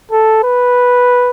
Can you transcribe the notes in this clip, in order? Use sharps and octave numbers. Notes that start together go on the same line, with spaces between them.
A4
B4